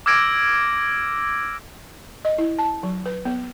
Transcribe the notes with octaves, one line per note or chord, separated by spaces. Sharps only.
D6 E6 F6 G#6 A#6 D7
D#5
E4
A5
F#3
B4
B3